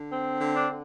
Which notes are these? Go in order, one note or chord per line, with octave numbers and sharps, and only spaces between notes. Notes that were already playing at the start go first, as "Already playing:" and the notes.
Already playing: D3
C4
D3
D4
D3